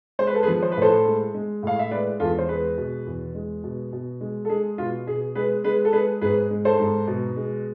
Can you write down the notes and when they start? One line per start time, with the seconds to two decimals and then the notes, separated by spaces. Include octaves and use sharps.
0.19 G#3 C5
0.27 B4
0.35 A4
0.43 G#4 B4
0.48 F3
0.62 C5
0.72 B4
0.77 A2 A4 C5
1.05 G#3
1.34 G#3
1.63 A2 F5
1.79 E5
1.91 G#3 B4 D5
2.20 E2 F4 A4
2.39 C5
2.48 G#3 G#4 B4
2.77 B2
3.06 E2
3.35 G#3
3.64 B2
3.93 B2
4.21 G#3
4.45 A4
4.50 G#3 G#4
4.78 B2 F4
5.07 B2 G#4
5.35 G#3 G#4 B4
5.64 G#3 G#4 B4
5.85 A4
5.93 G#3 G#4 B4
6.21 G#2 G#4 B4
6.51 G#3
6.65 A4 C5
6.79 G#2
7.07 B2
7.36 G#3